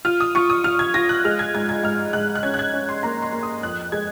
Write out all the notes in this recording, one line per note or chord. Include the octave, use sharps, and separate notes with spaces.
F4 F6
D#6
F4 C#6
D#6
F4 F6
G#6
F4 A#6
F#6
G#3 F6
G#6
G#2 G#6
G#6
G#2 F6
G#2 F#6
F#6
C#4 G#6
F#6
G#6
C#4
C6
A#3 A#5
C6
A#3
D#6
F2 F#6
G#3 G#6